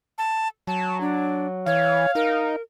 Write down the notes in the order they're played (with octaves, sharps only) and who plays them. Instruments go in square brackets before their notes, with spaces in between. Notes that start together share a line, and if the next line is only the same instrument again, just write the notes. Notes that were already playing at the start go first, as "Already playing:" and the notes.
[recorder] A5
[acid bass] F#3 [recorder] A5
[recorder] D4
[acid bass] E3 [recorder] C#5 [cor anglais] F5
[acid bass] D#4 [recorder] A#4